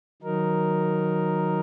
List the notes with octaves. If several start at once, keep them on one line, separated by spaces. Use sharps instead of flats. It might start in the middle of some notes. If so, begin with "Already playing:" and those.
D#3 F#3 D#4 A#4